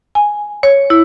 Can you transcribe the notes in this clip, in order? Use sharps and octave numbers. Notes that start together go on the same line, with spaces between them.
G#5
C#5
E4